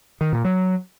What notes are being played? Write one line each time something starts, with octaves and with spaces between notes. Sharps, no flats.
D#3
A#2
F#3